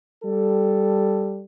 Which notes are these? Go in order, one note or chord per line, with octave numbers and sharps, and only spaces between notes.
G3 A4